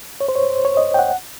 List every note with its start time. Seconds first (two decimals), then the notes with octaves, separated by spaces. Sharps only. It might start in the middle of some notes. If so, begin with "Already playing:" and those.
0.21 C#5
0.29 C5
0.35 C#5
0.50 C5
0.65 C#5
0.77 D#5
0.94 G5
0.99 F#5